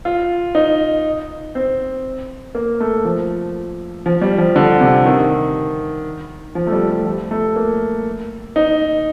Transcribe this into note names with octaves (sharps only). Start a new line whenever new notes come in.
F4
D#4
C4
A#3
A3
F3
F3
G3
F3
D3
C3
D#3
F3
A3
G3
A3
F3
A3
A#3
D#4